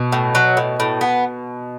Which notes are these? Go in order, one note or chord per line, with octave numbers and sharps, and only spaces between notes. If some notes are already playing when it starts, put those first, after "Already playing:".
Already playing: B2
A2
F#3
A2
A2
B3